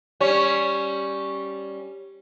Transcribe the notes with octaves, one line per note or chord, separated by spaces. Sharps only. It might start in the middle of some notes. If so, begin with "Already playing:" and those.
G3 C#4 C#5